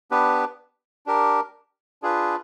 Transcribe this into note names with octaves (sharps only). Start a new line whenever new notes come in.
B3 D4 G4 B4
D4 G4 A#4
D4 F4 G#4 B4